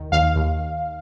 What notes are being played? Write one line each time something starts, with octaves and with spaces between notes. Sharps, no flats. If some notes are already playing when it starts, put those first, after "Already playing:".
Already playing: D#2 D#3
D#2 F5
D#2